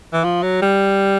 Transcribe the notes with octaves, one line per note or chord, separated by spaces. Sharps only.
E3
F3
F#3
G3